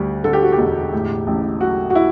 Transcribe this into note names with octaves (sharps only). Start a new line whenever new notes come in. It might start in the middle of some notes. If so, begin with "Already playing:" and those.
Already playing: D2 G3
D3 A4
G4
F#4
G4
E1
A2
A1
F#3 F#4
F#4
E4